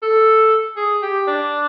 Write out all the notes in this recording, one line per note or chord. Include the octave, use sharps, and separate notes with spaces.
A4
G#4
G4
D4